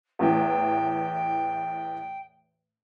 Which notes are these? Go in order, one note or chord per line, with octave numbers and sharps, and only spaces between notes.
E2 A2 E3 G5